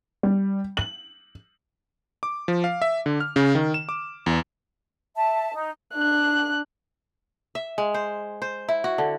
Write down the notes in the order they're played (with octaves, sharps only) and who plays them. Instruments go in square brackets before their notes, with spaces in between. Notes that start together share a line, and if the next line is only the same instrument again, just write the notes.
[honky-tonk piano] G3
F#7
[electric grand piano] D6
F3
F5
E5
D3
F6
C#3
D#3
E7
D6
E2
[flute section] E5 A5
D#4
[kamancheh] D4 F#6
[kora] E5
G#3
C5
C5
E4
F#4
D3